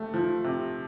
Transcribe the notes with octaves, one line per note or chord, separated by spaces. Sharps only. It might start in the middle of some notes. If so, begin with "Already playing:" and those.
Already playing: C3 A3
F3
C3